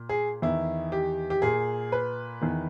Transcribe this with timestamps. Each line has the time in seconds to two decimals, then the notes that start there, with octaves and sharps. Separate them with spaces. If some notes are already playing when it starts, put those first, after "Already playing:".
Already playing: A#2
0.09 G#4
0.42 E2 D#3 E4
0.92 G4
1.30 G4
1.42 A#2 G#4
1.92 B4
2.41 E2 D#3